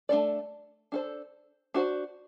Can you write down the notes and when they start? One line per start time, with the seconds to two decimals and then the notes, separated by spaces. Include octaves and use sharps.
0.09 A3 D4 A4 D5
0.92 D4 A4 C5
1.74 D4 F#4 C5